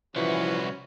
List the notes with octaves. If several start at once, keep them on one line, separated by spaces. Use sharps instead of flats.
C2 E3 F3 B3 C#4 F#4